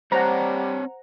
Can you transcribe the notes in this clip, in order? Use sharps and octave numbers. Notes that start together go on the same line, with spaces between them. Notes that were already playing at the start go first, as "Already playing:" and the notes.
G3 C4 C5 C#5 F#5 A5 A#5